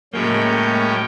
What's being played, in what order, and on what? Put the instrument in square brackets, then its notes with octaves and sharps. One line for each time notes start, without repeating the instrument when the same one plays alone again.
[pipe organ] A2 C#4 G5 [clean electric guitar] F#3 G#3 A#3